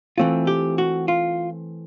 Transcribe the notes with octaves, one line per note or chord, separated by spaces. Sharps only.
E3 A3 C4 F4
G4
F#4
F4